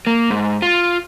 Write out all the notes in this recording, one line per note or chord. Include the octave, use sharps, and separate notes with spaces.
A#3
G#2
F4